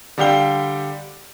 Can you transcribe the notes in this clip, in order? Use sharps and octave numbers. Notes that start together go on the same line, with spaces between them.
D3 G3 G4 F5 G5 G7